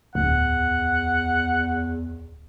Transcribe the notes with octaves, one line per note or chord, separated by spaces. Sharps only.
D1 E2 F#5